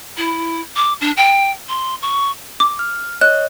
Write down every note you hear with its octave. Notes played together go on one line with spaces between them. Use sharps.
E4
D6
D4
G5
C6
C#6
D6
F6
C#5 D#5 F#6